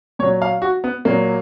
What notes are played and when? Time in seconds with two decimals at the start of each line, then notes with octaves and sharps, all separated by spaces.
0.19 A#2 C#5
0.22 F#3
0.42 F5
0.62 F#4
0.84 B3
1.05 A#2 F#3 A#3